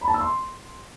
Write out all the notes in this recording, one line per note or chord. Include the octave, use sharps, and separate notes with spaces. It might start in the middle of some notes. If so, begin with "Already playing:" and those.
B5
A5
E6
C6